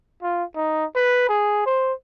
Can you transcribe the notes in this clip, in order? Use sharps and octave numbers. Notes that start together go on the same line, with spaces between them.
F4
D#4
B4
G#4
C5